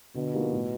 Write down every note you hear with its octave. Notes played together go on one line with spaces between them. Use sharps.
B2 D3
F3 A#3 D#4 G4
A2